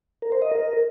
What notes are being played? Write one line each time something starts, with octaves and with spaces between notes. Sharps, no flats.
A#4
C5
D#5
A#4